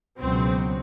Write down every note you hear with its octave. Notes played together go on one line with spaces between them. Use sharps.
C#2 B2 F#3 C4